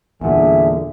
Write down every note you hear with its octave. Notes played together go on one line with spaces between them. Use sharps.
E2 A#2 D3 G#4 E5 G#5